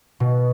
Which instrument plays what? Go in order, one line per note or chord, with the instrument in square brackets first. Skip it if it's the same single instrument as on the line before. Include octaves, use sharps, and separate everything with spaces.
[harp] B2